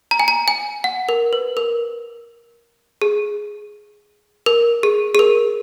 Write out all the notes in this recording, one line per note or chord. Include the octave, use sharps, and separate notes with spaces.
A#5
G#5
A#5
G#5
F#5
A#4
B4
A#4
G#4
A#4
G#4
G#4
A#4